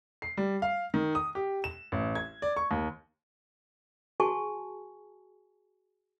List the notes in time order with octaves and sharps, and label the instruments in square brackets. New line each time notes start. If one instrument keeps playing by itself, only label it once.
[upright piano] C7
G3
F5
D#3
D#6
G4
E7
A1
G#6
D5
C#6
D#2
[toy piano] F#4 G#4 G#5 A5 C#6